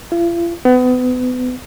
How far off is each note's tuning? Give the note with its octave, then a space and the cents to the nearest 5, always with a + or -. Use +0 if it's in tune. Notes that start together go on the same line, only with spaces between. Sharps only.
F4 -45
B3 +30